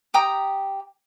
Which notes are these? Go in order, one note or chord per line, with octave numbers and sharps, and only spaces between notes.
G4 G5 A#5 D#6